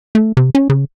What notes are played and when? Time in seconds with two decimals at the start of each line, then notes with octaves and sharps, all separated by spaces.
0.15 A3
0.37 C3
0.55 C#4
0.70 C#3